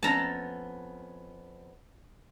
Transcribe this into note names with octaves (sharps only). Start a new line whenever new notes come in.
F2 B3 C#4 A5 A#5